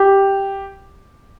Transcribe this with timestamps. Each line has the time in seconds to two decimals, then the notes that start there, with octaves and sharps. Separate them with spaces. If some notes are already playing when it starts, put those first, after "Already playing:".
Already playing: G4